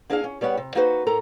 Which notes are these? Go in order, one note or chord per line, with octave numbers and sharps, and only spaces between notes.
A#3 D4 E4 G#4 D5 F5
C#4
G3 B3 C#5 E5 F#5
C3
A#3 D#4 F#4 G#4 B4 C5
A2 A4 A#4 A#5